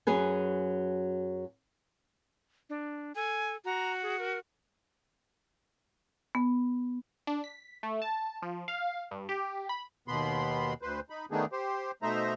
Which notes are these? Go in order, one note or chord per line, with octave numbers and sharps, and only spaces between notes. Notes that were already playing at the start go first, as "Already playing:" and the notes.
F#2 F#3 G#4 B4 G#5
D4
A4 G#5
F#4 A#5
G#4
A#4
B3
D4
B6
A3
A5
F3
F5
G2
G4
B5
D#2 B2 B3 B5 C6
D2 B4 C5
D#4 B5
D#3 A3 B3 D4 D#4 G#4
G4 C5
B2 A3 D#4 C5 E5 A#5